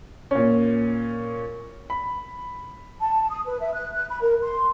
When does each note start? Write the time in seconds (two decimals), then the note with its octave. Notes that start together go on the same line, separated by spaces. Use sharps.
0.31 A#2 C#4
1.90 B5
3.00 A5
3.31 D#6
3.46 B4
3.60 E5
3.74 F#6
3.93 F#6
4.09 B5
4.22 A#4
4.43 C6